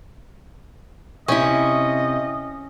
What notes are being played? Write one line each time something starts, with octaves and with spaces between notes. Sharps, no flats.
C3 C#4 E4 D#5